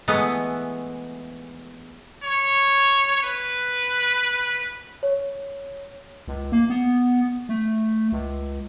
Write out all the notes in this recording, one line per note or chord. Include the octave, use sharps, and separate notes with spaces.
E3 G#3 A3 B3
C#5
B4
C#5
C#2
A#3
B3
A3
C#2